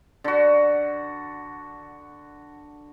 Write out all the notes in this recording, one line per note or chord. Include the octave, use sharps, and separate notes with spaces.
D3 F#4